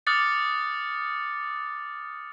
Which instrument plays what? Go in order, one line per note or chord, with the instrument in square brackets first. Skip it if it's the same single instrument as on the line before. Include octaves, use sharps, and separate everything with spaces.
[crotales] D6 D#6 F6 F#6 A6 C#7